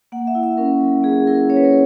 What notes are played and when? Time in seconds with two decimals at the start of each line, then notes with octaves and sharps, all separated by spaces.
0.12 A#3 F#5
0.27 E5
0.35 E4
0.43 E5
0.57 C#4 A#4
0.81 F#3
1.03 A#3 G#4
1.27 E4 A#4
1.49 C#4 C#5
1.57 B4
1.65 A#4